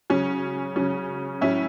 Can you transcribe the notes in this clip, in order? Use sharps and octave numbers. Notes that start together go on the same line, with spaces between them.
C#3 F#3 C#4
C#3 F#3 C#4
A2 F#3 C#4 E4